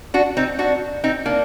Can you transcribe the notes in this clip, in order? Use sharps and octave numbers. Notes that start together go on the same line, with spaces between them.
D4 F#4
C4 D#4
D4 F#4
C4 D#4
A#3 D4